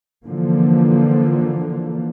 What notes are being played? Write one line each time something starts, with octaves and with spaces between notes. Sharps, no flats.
D3 E3 F3 A#3